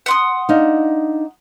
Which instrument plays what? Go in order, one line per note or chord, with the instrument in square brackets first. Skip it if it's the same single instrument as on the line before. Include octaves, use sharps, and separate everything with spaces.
[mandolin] F#5 C6 D#6
[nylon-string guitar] D4 D#4 F5